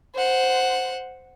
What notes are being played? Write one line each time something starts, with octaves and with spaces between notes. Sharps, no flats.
C5 F#5